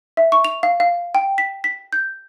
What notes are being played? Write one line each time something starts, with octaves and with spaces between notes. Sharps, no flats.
E5
C#6
F7
F5
F5
G5
B6
B6
G6